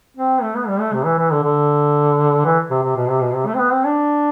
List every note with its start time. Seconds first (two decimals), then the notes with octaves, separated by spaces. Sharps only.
0.17 C4
0.42 A3
0.55 B3
0.68 G3
0.80 A3
0.93 C3
1.05 E3
1.18 E3
1.31 D3
1.44 D3
2.45 E3
2.71 C3
2.83 C3
2.96 B2
3.08 C3
3.21 B2
3.34 C3
3.47 A3
3.54 C4
3.59 B3
3.72 C4
3.85 D4